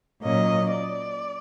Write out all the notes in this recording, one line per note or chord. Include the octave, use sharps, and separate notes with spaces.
A#2 F#3 A#3 C#4 D#5
D5